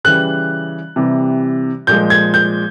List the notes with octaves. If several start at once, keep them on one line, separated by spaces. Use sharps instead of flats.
C#3 E3 G3 F#6
C3 E3 G3
A#2 F3 G#3 G6
G#6
G6